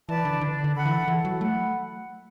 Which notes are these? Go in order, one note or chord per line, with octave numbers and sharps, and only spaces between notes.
E3 B4 D5 A5
D3
D3 D4
D3
A4 F#5 B5
E3
E3 A4
F#3
A3 F#5 B5